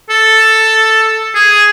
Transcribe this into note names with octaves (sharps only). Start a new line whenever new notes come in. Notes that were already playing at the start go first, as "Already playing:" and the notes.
A4
G#4